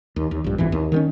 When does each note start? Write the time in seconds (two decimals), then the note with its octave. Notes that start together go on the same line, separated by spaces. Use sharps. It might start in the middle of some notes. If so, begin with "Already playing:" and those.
0.16 D#2
0.31 D#2
0.44 A#1 G2
0.58 A#1 F2 G#2 E3
0.72 D#2
0.92 D#3 G#3 C#4